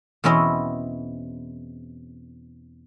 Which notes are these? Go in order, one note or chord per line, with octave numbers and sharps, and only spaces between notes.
E2 B2 C4 C#4 E4 D#5